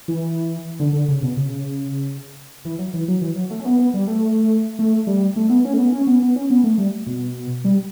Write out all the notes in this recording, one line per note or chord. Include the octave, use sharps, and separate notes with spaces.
E3
D3
D3
C#3
B2
C#3
E3
F#3
E3
F#3
E3
F#3
A3
C#4
B3
B3
G3
A3
A3
G3
A3
B3
C#4
A3
B3
C#4
B3
B3
C#4
B3
A3
G3
B2
G3